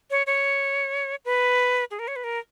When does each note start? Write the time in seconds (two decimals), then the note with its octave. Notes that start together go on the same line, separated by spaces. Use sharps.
0.11 C#5
0.27 C#5
1.25 B4
1.91 G#4
1.99 A#4
2.08 C#5
2.16 B4
2.24 A#4